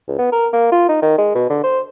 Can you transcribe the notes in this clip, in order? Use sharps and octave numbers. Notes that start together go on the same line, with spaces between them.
C#2
B3
A#4
A#3
F4
D#4
D#3
G#3
B2
D3
C5